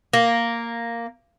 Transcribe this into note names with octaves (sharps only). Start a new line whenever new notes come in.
A#3